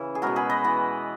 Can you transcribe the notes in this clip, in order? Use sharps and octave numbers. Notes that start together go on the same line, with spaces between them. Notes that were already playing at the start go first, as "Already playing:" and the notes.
Already playing: C#3 E3 C#4 E4
G#4
B2 G#3 B3 F#4 A#4
G#4 B4
B4 D#5
E3 B3